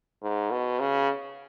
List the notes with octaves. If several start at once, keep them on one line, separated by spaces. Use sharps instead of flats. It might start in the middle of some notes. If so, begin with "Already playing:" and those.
G#2
B2
C#3